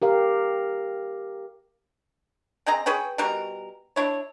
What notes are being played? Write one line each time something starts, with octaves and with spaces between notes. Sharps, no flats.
G4 A#4 F5
C4 G#4 D#5 A#5
G#4 B4 C#5 G5
B2 E3 G3 A#4
D4 E4 C#5